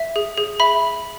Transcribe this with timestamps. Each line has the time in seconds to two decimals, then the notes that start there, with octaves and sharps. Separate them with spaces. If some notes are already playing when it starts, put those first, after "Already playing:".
Already playing: E5
0.16 G#4
0.37 G#4
0.60 E5 B5